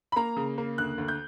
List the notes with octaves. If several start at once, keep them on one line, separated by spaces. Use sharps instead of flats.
B5
A#3 A#5
C#3
A#3
D2 F#6
D2
G6